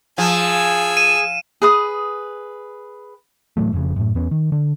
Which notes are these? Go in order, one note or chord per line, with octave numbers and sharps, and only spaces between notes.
F3 G#4 G#5 E6
D#7 E7
G#4 B4 D#6
A2 E3 F#3 A3
F1 F2 A2 C#3
F#2 A2
E2 B3 C#4
D#3
D3